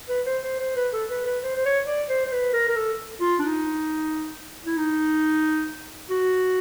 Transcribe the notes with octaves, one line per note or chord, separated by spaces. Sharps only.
B4
C5
C5
C5
B4
A4
B4
B4
C5
C5
C#5
D5
C5
C5
B4
A#4
A#4
A4
F4
D4
D#4
E4
D#4
F#4